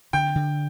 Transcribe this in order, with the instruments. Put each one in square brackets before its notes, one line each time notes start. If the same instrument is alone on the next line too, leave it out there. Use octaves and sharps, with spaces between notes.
[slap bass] D3 [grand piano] G5
[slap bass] D3